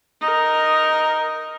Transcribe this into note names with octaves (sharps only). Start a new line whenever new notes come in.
D#4 A#4